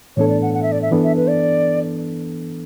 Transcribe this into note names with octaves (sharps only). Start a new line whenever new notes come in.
A2 E3 B3 D4 A4 C#5
D5
F#5
F#5
E5
D5
E5
E3 B3 D4 A4
E5
B4
D5